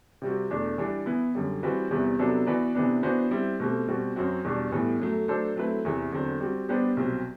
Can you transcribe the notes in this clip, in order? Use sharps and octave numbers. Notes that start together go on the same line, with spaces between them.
C3 G3 C4 F#4
E2 B2 A3 D4
E3 G3 D4
E3 B3 E4
F#2 D3 G3
E3 G3 C4 F#4 B4
E2 C3 E3 G3 B3
C3 F#3 B3 D4 A4
E3 B3 F#4 B4 D5
C3 E3 B3 D4
E3 B3 D4 F#4 C5
G3 C4 E4
B2 A3 C4 G4
B2 G3 C4 F#4
F#2 F#3 C4 F#4
E2 B2 G3 D4
A2 E3 G3 B3
F#2 F#3 A3
F#3 A3 D4 A4 C5
F#3 A3 C4 E4 B4
E2 C3 E3
E2 D3 F#3 C4
G3 C4 F#4
G3 B3 D4 G4 C5
C2 B2 F#3 C4